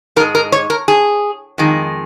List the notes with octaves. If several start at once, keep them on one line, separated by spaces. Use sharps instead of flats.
G#2 G#3 A#4
A#4
C#5
A#4
G#4
F2 D#3 G#3